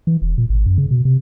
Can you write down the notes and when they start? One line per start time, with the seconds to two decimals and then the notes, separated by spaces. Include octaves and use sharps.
0.07 E3
0.22 E1
0.38 A#2
0.49 G#1
0.66 F#2
0.78 C#3
0.91 B2
1.05 C3